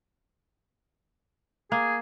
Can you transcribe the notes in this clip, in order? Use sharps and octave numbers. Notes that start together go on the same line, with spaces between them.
A#3 G#4